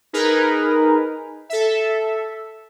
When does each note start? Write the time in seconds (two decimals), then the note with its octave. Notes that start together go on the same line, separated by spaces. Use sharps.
0.13 D#4 G#4 A#4 B4
1.49 A4 E5